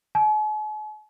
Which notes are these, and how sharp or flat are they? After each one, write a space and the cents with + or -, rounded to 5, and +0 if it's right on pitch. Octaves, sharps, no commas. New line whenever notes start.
G#5 +45